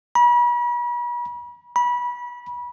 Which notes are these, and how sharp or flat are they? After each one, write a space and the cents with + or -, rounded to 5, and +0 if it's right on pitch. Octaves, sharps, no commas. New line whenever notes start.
B5 -40
B5 -25